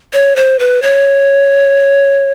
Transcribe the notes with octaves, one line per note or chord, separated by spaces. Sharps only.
C#5
C5
B4
C#5